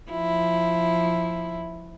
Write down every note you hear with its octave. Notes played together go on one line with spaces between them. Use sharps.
F3 E4